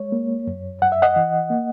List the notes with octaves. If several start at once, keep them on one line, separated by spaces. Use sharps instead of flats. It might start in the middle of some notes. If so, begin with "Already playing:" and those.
Already playing: G#3 C#5
A#3
F#2
F#2 F#5
E5
D#5 F#5
E3
A#3